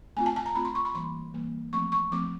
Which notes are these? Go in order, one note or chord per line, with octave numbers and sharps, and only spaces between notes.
A3 C4 F4 G#5
A5
A5
A#5
A3 C4 F4 B5
C6
C#6
B5
E3 G3 A#3 C6
E3 G3 A#3
F3 A3 C4 C#6
C#6
F3 A3 C4 D6